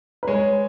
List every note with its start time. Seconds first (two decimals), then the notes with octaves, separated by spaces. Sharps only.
0.23 B4
0.27 G#3 C#5